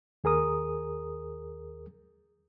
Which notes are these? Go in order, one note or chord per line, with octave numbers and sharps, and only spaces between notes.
D#2 G#4 A#4 D#6